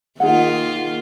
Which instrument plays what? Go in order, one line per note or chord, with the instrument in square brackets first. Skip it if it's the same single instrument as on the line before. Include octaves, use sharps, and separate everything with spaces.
[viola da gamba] D#3 A#3 F4 [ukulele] D#4 G#4 F#5